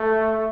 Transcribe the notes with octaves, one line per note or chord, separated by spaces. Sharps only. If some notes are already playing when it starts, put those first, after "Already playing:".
Already playing: A3